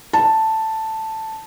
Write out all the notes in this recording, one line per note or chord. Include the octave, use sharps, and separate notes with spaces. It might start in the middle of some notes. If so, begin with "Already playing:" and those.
A5